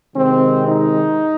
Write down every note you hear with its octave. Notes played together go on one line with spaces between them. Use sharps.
C3 D#3 G#3 C4
D#4